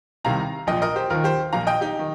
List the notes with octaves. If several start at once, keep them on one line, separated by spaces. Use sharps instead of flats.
C2 C3 D#3 F5 A#5
A#1 A#2 D#5 G5
A#4 D#5
G4 C5
D#2 D#3 F4 A#4
G4 C5
A#1 A#2 F5 A#5
D#5 G5
D#4 G4
D#3